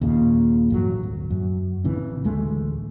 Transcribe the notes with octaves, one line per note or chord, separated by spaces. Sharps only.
D#2 A#2 C#3
A1 G2 F#3
D1
F#2
A1 C#3 E3 C4
A1 D2 G#3 A3